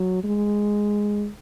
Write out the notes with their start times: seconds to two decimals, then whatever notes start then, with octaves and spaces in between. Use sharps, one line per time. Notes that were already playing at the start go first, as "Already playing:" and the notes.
Already playing: F#3
0.24 G#3